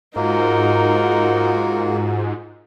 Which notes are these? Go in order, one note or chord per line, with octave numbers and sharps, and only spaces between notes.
G#2 A#3 D#4 F4 F#4 A#4